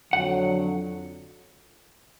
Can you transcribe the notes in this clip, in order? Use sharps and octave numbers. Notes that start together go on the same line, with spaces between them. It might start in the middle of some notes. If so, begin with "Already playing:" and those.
F2 D3 F#3 F#5